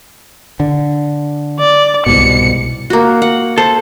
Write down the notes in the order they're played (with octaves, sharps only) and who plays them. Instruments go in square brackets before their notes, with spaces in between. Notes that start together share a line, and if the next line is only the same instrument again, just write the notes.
[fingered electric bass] D3
[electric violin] D5
[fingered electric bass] C2 G#2 B2 [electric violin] C#7
[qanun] A#3 F#4
F#5
[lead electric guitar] A4 [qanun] C5